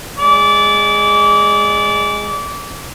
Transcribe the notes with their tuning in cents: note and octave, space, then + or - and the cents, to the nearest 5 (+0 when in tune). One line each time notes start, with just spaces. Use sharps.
G#3 -5 D5 -25